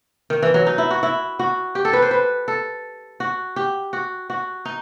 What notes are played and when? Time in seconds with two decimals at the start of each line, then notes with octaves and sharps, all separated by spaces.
0.30 D#3
0.42 E3
0.54 F#3
0.66 D#4
0.78 E4
0.91 F#4
1.03 E4
1.39 F#4
1.75 G4
1.85 A4
1.93 B4
2.02 C5
2.11 B4
2.48 A4
3.20 F#4
3.56 G4
3.93 F#4
4.30 F#4
4.65 D#4